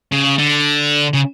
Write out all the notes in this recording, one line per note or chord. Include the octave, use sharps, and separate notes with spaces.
C#3
D3
C#3